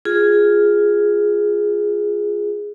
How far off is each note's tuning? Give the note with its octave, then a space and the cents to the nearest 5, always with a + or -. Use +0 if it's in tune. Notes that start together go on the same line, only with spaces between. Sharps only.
F4 +0 G#4 +0